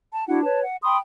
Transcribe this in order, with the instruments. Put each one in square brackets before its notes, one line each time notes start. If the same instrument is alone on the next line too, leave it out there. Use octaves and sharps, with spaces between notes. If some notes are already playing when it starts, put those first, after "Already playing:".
[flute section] A5
D4 E4 F#4 F#5
B4 C#5 A5
F#5
G5 B5 C6 D#6